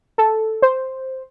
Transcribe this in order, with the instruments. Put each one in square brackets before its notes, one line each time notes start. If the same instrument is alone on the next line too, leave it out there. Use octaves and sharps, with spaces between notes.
[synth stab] A4
C5